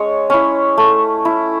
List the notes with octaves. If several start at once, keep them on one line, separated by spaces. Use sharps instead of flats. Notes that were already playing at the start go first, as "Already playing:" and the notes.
Already playing: G#3 C#4 C#5
C#4 E4
A3
E4